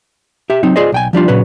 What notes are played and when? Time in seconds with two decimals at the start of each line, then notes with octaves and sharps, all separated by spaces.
0.50 G4 E5
0.63 F#3 C4 D#4
0.76 F4 G#4 C5 D5 D#5
0.92 B1 G5 G#5
1.13 F3 G3 D4 F4
1.28 A#2 C#3 F#3 B4